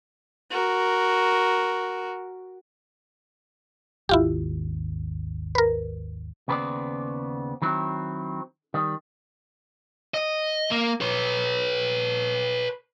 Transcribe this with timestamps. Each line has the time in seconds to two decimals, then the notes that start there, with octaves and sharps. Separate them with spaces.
0.51 F#4 A#4
4.09 G#1 D#2 E4 F4 G4
5.55 A#4 B4
6.48 D#2 C#3 B3 B4 C5 D5
7.62 D#3 F#3 C4 E4
8.74 D#3 G3
10.14 D#5
10.71 A#3
11.01 B4 C#5